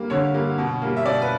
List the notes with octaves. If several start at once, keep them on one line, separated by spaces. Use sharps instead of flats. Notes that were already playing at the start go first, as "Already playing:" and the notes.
Already playing: G3 A#3
D3 C#5
G3 A#3
B2
G3 A#3
E5
B2 D5
B4